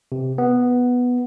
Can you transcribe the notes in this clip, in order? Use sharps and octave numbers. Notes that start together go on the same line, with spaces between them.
C3
B3